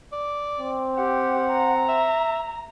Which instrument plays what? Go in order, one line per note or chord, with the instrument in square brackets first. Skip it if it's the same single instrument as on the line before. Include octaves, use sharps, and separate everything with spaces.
[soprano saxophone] D5
[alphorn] C4
[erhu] G4 [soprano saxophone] F#5
[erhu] A#5
[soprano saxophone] E5